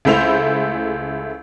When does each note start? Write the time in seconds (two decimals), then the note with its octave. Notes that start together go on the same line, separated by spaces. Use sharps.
0.05 C#2 G#3 A3 E4 C5 F7